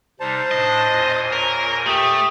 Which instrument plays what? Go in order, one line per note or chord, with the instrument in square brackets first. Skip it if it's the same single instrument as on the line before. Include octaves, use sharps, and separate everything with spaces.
[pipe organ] C3 G3 D#4 [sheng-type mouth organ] C5 A5
[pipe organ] A2 D4 [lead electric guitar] D#5
[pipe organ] E2 A#2 G#5
[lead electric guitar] A#4 [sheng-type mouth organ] C#5
[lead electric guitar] A3 [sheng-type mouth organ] G4 [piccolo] D#6